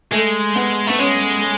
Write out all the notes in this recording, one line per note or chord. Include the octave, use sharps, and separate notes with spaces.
G#3 A3
B3
A3 B3
G#3 C#4